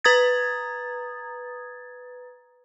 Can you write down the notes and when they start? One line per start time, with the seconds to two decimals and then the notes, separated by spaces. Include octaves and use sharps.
0.04 B4 A#5 D#6 G#6 A6